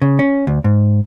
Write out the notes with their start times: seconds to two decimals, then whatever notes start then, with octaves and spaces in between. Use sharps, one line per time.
0.02 C#3
0.19 C#4
0.47 D2
0.64 G#2